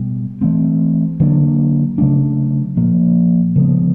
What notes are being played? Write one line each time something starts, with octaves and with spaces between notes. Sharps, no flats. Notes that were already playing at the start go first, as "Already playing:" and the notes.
Already playing: B2 G3
E3 A3 C4
D3 F#3 A#3 D4
C#3 F#3 A3 D4
A#2 F3 A#3
C#3 F3 G#3 B3